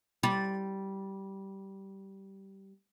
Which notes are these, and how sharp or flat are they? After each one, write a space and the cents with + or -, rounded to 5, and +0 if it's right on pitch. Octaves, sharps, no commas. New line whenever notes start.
G3 -15